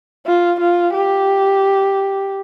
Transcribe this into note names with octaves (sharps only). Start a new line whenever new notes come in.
F4
F4
G4